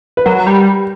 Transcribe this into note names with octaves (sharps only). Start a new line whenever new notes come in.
B4
F#3 A#4
G3